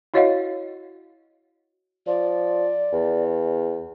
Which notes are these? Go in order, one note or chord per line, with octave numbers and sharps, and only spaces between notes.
E4 F#4 C#5 D#5 F5 F#5
F3 D5
E2